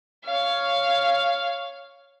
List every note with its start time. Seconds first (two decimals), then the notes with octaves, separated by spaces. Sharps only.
0.24 C#5 F5